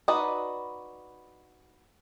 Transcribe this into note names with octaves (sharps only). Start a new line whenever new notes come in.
D#4 F#4 B4 D5 D#5